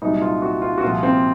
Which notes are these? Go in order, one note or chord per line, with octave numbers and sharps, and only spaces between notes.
C2 A#2 F#3 D#4
F4
F#4
F4
F#4
C2 A#2 F3 F4
C4